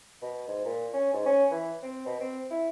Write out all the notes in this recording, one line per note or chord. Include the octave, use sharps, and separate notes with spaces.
B2
G#2
A#2
C#4
G#2
C#4
E3
C4
B2
C4
E4